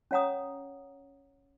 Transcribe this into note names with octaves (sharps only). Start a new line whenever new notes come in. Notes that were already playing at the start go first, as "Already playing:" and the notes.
C#4 C#5 F#5 A#5 D#6